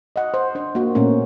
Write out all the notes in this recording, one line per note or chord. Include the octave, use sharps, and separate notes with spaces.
D#5 F#5
C5
D4 C5
A#3 F#4
A#2 A3 B3 C#4 A#4